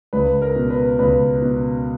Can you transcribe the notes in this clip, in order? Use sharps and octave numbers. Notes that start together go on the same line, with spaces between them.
C#2 B4
A#4
B2
B4
C#2 B4
B2